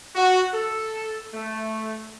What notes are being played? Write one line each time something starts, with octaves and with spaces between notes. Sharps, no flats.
F#4
A4
A3